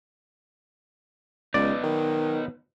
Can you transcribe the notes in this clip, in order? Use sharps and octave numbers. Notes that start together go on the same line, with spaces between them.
C#2 B3 D#4 D5
D#3